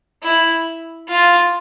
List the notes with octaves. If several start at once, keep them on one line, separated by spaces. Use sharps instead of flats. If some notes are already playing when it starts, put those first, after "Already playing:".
E4
F4